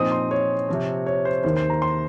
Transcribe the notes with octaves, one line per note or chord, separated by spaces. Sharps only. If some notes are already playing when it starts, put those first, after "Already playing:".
Already playing: A#2 F3 C4 D#4 D#6
C6
C#5
C3 F3 C4
C#5
C5
D#2 D#3 A#3 C5
C5
A#5
C6